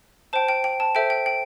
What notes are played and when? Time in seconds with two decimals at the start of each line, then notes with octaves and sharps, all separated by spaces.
0.33 C5 G5 A5
0.49 G5
0.64 G5
0.80 A5
0.95 A4 C5 E5 G5
1.10 G5
1.26 G5